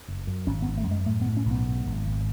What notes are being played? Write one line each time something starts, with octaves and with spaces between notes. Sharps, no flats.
F#1
F#2
G#1 C#4
B3
G#1
A3
F#2 G#3
A2 A3
B3
A2
C#4
B1
B3
G#2
G#1
G#1